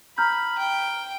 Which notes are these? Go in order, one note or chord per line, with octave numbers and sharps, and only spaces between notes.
A#5 B5 F6 G6
G5